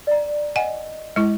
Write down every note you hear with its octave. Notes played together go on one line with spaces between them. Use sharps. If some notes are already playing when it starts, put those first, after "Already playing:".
D5 A#5
D#5 F#5 G#5
G#3 E4